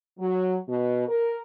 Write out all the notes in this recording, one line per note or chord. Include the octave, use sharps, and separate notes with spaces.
F#3
B2
A#4